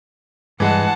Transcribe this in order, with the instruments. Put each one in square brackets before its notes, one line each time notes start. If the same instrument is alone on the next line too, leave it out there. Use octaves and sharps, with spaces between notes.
[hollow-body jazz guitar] G2 [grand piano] E3 G#3 [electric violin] F#5 A5